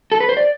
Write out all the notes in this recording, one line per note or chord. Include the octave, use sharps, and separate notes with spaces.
A4
B4
C5
D5